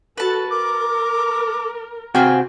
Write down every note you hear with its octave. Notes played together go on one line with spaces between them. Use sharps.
F#4 A4 B4 A5
A#4 D6
C3 C4 F4 F#4 G#4 G5